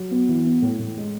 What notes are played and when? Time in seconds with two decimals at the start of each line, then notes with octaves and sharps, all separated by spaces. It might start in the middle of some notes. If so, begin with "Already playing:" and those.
Already playing: F#3
0.11 B3
0.29 E3
0.46 B3
0.62 A2
0.79 A2
0.97 G#3